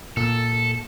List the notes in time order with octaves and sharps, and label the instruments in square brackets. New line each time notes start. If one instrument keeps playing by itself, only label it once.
[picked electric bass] A#2 [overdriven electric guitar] A4